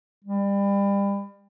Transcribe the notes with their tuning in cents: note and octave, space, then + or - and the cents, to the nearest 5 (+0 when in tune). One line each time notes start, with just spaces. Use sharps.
G3 +30